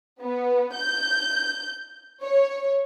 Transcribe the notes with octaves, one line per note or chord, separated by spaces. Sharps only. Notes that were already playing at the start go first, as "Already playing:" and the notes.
B3
G6
C#5